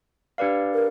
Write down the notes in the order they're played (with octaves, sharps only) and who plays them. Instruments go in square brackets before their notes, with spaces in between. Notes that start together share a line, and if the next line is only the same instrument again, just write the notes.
[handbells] D4 G4 B4 D5 F5
[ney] A#4